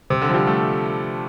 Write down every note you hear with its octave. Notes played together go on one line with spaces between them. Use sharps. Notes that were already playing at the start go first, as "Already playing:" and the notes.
C3
D3
F3
G3
A3